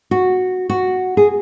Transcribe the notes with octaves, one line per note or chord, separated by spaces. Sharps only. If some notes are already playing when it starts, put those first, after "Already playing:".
F#4
F#4
G#4